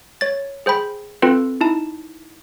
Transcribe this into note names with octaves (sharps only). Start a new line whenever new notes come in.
C#5 A6
G#4 C5 G5 B5
C4 F4 A4 B4
D#4 E4 A5